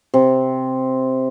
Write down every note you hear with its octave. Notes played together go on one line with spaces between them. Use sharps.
C3